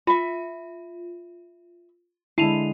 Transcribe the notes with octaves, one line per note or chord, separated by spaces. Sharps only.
F4 E5 B5
D3 G#3 E4 A5 C7 D#7 F7